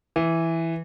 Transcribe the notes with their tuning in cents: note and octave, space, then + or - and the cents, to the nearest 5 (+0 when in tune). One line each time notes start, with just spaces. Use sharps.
E3 +0